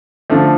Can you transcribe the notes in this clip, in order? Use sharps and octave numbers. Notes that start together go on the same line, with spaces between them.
D3 F3 A3